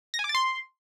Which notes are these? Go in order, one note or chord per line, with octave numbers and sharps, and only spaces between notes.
A#6
G#5
D6
A6
C6